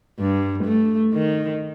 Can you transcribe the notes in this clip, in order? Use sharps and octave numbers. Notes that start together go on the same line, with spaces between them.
G2
A3
D#3